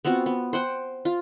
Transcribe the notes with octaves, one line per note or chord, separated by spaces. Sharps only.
B3 C4 F4 F#4
B3
C5 F#5 G5
F4